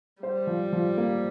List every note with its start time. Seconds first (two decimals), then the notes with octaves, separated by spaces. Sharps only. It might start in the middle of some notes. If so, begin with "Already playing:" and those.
0.22 G3 C5
0.47 F3
0.73 F3
0.97 A#3